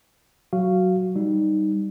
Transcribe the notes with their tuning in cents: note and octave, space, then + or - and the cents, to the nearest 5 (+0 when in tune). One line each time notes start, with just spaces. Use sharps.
F#3 +0 F#4 +0 F5 -10
G3 +0 D#4 +0